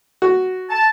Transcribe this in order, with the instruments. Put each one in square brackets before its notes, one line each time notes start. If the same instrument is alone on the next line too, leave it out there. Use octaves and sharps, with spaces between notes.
[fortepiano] F#4
[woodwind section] A5